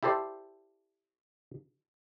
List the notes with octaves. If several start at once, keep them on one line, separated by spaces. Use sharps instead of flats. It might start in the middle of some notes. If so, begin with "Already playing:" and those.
E4 G4 A4 C5 D5